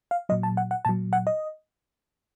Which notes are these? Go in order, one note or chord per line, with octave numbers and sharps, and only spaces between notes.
F5
A#2 F#3 D#5
A5
F#5
F#5
A#2 F#3 A5
F#5
D#5